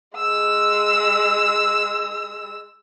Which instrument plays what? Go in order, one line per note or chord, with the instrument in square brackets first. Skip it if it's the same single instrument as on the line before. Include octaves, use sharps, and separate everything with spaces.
[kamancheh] G#3 E6